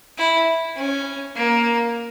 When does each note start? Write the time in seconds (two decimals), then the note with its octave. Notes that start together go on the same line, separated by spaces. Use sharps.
0.17 E4
0.76 C#4
1.35 A#3